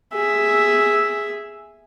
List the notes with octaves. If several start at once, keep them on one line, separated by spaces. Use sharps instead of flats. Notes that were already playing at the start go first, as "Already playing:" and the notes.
G#4 E5